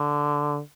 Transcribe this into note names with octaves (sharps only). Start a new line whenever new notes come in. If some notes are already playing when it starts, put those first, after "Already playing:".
Already playing: D3